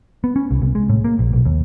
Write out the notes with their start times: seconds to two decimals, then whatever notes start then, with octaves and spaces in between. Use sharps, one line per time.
0.24 B3
0.36 C#4
0.51 C2
0.62 C2
0.75 G#3
0.90 A2
1.04 A#3
1.19 A#1
1.33 B1
1.45 D#2